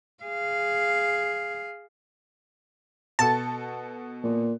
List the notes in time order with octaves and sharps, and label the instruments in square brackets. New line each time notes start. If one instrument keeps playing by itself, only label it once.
[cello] G#4 F5
[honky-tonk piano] B2 F#4 A4 [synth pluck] A5
[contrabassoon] A#2